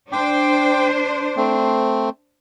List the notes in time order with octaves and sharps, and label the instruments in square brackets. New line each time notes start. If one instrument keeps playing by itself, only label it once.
[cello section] D4 C5 [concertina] G5 D6
[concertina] A3 C4